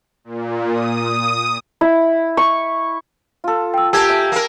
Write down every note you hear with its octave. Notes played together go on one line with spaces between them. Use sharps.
A#2
D#6
E4
C#6
F4 A4
G5 E6
A#3 G4 A4 G#5 A5 E6 G#6
E5
A#3 A#4